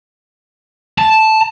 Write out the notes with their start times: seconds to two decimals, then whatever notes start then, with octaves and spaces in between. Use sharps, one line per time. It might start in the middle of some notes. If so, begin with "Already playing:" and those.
0.98 A5